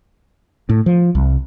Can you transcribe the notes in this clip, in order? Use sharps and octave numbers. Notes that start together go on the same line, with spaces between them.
A2
F3
C2